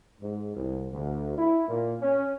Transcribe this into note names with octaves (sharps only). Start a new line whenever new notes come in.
G#2
C2
D2
E4
A#2
C#4